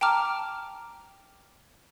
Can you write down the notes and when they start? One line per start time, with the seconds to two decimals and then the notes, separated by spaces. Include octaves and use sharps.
0.01 G5 A5 A#5 D6 F6